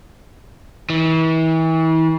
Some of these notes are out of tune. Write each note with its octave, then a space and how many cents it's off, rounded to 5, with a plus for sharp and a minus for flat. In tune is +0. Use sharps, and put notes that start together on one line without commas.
E3 -35